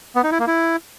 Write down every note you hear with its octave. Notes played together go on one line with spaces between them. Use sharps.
B3
D#4
E4
A#3
E4